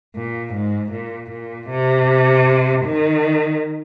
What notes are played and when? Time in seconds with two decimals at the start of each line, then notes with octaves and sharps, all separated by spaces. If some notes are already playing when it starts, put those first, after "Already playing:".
0.16 A#2
0.54 G#2
0.92 A#2
1.31 A#2
1.70 C3
2.85 D#3